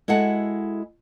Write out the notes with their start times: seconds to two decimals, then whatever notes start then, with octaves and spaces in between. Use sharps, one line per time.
0.08 G#3 E4 F#4 A4 F#5